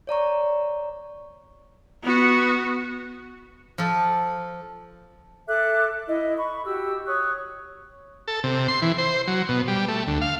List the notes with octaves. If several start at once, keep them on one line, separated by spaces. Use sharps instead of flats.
C#5 D5 A#5 C#6
B3 F#4
F3 A4
A4 E5 D6 F#6
E4 D#5
B5 C#6
F#4 G4 E6
C#5 C#6 D#6 F#6
A4
C3
C6
E3
C5
F#3
B2
G3
A3
D2
F5